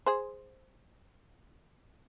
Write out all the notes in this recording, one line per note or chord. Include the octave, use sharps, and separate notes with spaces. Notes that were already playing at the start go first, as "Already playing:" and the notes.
G#4 C5